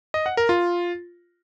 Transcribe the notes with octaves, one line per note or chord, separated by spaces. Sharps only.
D#5
F#5
A#4
F4